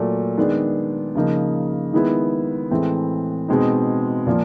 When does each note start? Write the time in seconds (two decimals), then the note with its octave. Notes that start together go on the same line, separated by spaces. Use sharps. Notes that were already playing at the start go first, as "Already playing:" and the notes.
Already playing: A#2 F#3 A3
0.37 D#3 G#3 B3 D4
1.15 C#3 F3 A#3 D#4
1.93 D#3 G#3 B3 E4
2.71 A2 E3 G#3 C4
3.48 B2 G#3 C4 D#4
4.27 A#2 F3 A#3